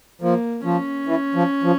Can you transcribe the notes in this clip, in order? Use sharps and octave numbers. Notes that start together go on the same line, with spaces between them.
F3 A#3
F3 C#4
E3
F3
F3